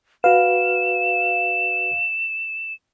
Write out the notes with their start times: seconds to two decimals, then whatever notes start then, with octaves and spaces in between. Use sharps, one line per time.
0.24 F#4 B4 F5 E7